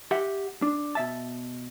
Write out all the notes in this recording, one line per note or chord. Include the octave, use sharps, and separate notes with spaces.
G4 E5 F#5
D4
B2 E5 A5